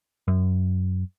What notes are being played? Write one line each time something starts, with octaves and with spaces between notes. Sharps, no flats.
F#2